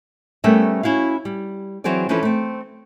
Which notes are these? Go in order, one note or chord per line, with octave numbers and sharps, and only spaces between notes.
G3 A3 B3 C#4 A#4 E5
C#4 E4 F#4 F5
G3
E3 F#3 C4 F#4 G#4 D5
E3 F3 C#4 D4 A4 B4
A3 C4